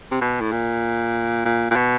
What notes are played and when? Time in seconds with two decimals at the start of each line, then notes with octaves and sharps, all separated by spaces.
0.12 C3
0.21 B2
0.41 A2
0.52 A#2
1.45 A#2
1.71 A#2
1.76 B2